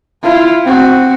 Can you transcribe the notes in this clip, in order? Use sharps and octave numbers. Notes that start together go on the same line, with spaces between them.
E4 F4
C4 F#4